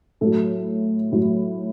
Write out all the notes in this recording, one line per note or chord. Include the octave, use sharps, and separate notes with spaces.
A2 F#3 A4
A2 F#3